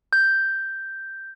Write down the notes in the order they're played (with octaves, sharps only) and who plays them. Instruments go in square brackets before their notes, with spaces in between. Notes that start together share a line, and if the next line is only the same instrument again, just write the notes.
[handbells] G6